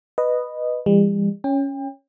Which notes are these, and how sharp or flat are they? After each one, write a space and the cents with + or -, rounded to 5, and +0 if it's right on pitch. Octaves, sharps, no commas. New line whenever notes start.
B4 +0 D#5 -10
E3 +35 G3 +45
C#4 +0 G5 +35